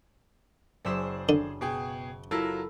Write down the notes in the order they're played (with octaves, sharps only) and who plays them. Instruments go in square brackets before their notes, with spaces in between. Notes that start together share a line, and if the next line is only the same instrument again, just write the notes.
[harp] F#1 E5 E7 [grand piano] G#4 C5 D5
[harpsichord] D3
[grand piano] B2 G#4 G5
[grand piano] F#3 F4 A#4 [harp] E4 A4